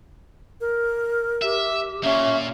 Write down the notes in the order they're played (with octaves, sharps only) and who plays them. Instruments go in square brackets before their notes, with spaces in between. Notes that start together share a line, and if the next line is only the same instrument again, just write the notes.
[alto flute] A#4
[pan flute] G4 [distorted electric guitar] E5
[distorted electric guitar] A#2 A#3 [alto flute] C#4 [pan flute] E5